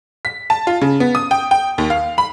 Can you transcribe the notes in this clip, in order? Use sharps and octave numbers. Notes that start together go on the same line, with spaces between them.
B6
A5
F4
C#3
B3
D#6
G5
G5
D#2
F5
B5